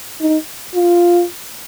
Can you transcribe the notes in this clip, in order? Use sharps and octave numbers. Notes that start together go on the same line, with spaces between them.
D#4
F4